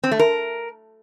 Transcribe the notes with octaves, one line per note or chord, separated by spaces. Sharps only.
C4
A3
A#4